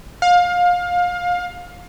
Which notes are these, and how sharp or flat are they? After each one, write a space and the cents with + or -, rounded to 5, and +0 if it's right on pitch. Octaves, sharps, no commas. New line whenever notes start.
F5 +25